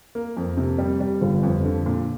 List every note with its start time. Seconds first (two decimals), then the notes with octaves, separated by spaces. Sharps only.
0.15 A#3
0.37 F2
0.57 C3
0.78 G3
1.00 G3
1.22 G1
1.43 F2
1.64 D3
1.86 A#2